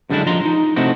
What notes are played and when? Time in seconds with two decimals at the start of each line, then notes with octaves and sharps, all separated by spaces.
0.10 F#2 D3 G3 G#3 D4 E4
0.26 F3 D#5 A#5 C6
0.45 D#4
0.76 C3 A3 C4 D#4 E4 F#4